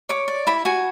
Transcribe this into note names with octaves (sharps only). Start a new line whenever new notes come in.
C#5 D6
D5
E4 B5
F#4 G#5